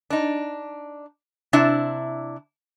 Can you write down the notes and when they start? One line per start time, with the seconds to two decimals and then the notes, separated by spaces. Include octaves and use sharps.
0.10 D4 D#4
1.53 C3 D4 E4